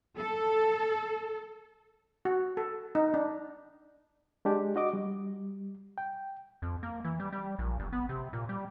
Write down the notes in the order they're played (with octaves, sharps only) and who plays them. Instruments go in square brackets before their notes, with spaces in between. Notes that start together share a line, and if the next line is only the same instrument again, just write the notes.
[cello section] A4
[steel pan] F#4
A4
D#4
D4
[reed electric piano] G#3 D4 G4
F#4 D#5 D6
G3
G5
[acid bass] F2
A#3
E3
G3
G3
A#1
G1
B3
C3
A#2
G3